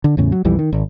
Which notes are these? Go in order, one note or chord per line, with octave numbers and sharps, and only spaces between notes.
D3
E2 A2 C#3
F#3
B1 F2 E3 G3
D#3
G#1